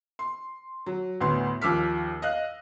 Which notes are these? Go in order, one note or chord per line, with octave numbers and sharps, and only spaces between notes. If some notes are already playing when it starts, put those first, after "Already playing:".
C6
F#3
D2 A2 B3 C6
D#2 F3 D6 E6 F6 B6
D#5 F5 F#6